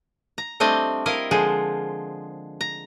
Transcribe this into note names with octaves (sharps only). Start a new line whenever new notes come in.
A#5
G3 A3 C4 D4 D#5 G5
E4 A#4 D#5 F5
D3 F3 G#3 G#4 C5
A#5